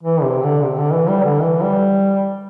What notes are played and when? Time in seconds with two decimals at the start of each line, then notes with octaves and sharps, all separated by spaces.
0.03 E3
0.23 C3
0.43 D3
0.64 C3
0.78 D3
0.93 E3
1.09 G3
1.24 D3
1.43 E3
1.62 G3